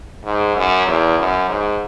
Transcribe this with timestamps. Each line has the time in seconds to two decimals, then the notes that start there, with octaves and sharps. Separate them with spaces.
0.25 G#2
0.56 F#2
0.87 E2
1.19 F#2
1.49 G#2